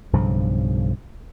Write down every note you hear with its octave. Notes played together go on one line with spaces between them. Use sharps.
B1 G2 C#3 F3